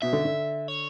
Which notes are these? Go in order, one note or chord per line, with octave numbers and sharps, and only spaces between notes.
B2 E5
D3
D3
C#5